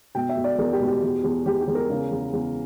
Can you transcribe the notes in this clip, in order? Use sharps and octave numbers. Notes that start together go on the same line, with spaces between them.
B2 G5
E5
B2
D5
E2 A#4
G4
B2
G4
E2
E2
E2 G4
G4
E2
A#4
C#3
E2
E2